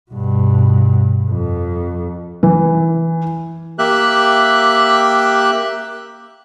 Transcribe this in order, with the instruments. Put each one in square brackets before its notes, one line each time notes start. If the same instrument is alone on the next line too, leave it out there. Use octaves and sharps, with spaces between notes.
[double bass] G2 B2
F2
[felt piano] E3
[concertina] A#3 G4 E5 F#6